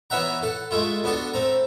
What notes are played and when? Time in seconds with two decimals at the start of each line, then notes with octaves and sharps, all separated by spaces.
0.10 E3 B3 C#4 E5 F#5 A#5
0.43 A4 F#5
0.71 G#3 A3 E4 F4
1.04 B3 D4 F#4 A4
1.34 A3 C4 A#5